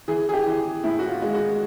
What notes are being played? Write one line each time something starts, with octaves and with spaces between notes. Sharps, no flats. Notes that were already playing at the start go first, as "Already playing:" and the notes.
E3 G#4
G#4
G4
E3
A2 E4
F#4
F4
G#3
F#4